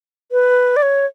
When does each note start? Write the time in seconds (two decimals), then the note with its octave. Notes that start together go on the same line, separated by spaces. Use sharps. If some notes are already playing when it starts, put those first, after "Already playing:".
0.32 B4
0.76 D5
0.82 C#5